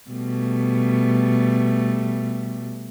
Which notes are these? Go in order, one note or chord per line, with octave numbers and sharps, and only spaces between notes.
B2 G3 A3